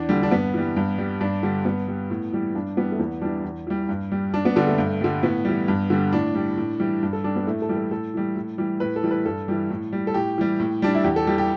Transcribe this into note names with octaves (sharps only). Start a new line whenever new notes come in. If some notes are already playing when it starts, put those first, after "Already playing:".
Already playing: E2 D4
D3 G3
D4
G2 B3
E3 G3
G2
G3
G2 D4
D3 G3
G2 B3
G3
A2
E3 G3
G2 D4
E3 G3 B3
A3
E2 B3
E3 G3 D4
E2
E3 G3
G2
G3
G2 D4
B3
D3 G3 D4
A3
G2
D3 G3
A2 B3
E3 G3
G2
D3 G3
A2 D4
G3
A2
E3 G3
G2
A4
G3 D4
B3
A2 A3
A4
E3 G3
A4
A2 A4
E3 G3
A2
E3 G3
A2 B4
A4
E3 G3
B4
G2 A4
E3 G3
A2
G3
A4
A2 G4
E3 G3
A2
G3 D4
E4
E2 G4
A4
E3 G3 G4
G4